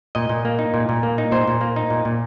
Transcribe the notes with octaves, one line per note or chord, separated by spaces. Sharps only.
A#2 D#5
A#2
A#3
D#4
A#2
A#2
A#3
D#4
A#2 C5
A#2
A#3
D#4
A#2
A#2